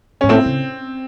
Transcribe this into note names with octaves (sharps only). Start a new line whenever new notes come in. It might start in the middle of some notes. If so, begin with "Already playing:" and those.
G#2 C#4
A2 C4
C#3